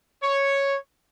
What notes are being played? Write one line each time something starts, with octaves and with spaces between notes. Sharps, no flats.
C#5